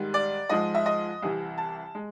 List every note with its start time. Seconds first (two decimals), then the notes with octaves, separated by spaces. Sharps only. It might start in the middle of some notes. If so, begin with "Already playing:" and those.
Already playing: G#2 D#3 G3
0.14 D5
0.49 G#2 F3 G#3 D#5
0.75 E5
0.86 D#5
1.22 C2 C3 E3
1.58 A5
1.95 G#3